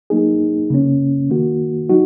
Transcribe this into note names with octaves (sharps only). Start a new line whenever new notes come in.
F#3 A#3 D#4 G#4
C#3 A#3 C#4
D#3 A#3 F#4
F#3 D#4 F#4